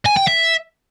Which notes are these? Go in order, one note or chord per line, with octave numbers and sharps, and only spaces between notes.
G#5
G5
E5